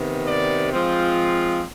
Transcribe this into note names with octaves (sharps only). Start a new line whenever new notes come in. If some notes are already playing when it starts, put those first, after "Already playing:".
Already playing: C3 D#3 B3
D5
F3 G#3 C4 F4